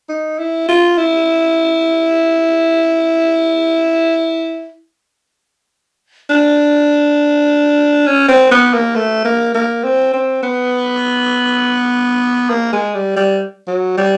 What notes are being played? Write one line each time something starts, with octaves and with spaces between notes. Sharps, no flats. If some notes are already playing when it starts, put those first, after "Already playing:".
D#4
E4
F4
E4
D4
C#4
C4
B3
A#3
A3
A#3
A#3
C4
C4
B3
A#3
G#3
G3
G3
F#3
G3